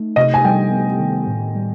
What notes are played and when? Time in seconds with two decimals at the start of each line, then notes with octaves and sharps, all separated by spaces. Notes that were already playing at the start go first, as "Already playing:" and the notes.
Already playing: A3 D#4
0.16 C3 D#5
0.34 G#5
0.44 G3 G5
0.71 B3
0.99 D#3
1.27 A2
1.55 G3